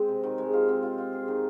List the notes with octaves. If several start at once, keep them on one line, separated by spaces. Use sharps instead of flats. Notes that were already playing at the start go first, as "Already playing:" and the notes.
Already playing: G#3 C4 C5
C3
D#3
G#3
F4
C4
F4
F4
G#4
D#3